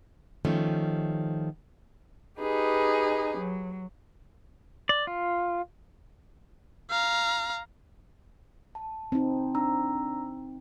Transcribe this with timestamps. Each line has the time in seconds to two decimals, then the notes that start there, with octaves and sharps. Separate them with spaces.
0.45 D#3 F3 G3 A3 C#4
2.40 D#4 G4 G#4 B4
3.37 F#3
4.89 D5
5.07 F4
6.90 F5 A#5
8.75 A5
9.12 C4 D#4
9.55 D4 A#5 E6